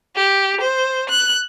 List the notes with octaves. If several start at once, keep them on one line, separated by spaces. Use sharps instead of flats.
G4
C5
F#6